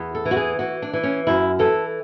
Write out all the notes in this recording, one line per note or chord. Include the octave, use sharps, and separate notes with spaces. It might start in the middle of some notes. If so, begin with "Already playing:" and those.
Already playing: E2
A4
E3
F#4
G#4
E3 F#4
D4
E3
C#4
F#2 E4
E3 A4